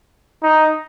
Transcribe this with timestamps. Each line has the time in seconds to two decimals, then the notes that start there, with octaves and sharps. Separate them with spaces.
0.43 D#4